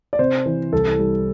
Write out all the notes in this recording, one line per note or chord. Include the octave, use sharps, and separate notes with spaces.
D5
C3 C5
E3
C2 A4
G3